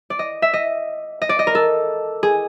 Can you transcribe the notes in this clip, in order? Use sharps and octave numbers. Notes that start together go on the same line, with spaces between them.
D5
D#5
E5
D#5
D#5
D5
D#5
A#4
A4
G#4